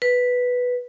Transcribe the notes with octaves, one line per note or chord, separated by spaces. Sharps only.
B4